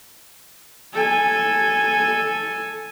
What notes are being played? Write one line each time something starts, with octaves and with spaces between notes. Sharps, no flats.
A4 G#5